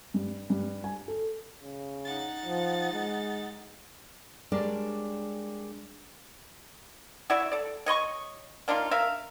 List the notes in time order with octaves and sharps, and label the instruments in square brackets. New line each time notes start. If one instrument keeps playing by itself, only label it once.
[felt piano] G2
G2
G#5
A4
[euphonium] C#3
[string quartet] D#4 F#5 A6
[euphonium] F3
G#3
[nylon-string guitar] G3 G#3 D4 A#4 C#5 D5
[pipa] E4 F#4 D5 E5
A4 D5
C#5 D#5 C6 C#6
A#3 D4 D#4 F4
A#4 E5 F5